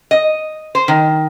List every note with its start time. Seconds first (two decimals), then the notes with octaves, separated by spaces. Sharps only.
0.11 D#5
0.75 C5
0.88 D#3